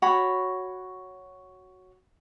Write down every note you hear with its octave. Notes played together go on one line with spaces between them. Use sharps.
F#4 C#5 B5